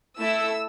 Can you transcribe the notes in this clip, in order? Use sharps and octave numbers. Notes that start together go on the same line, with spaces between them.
A3 E4 A4 E6